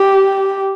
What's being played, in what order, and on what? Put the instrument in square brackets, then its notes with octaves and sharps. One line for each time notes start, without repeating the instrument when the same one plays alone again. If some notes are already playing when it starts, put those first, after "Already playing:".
Already playing: [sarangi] G4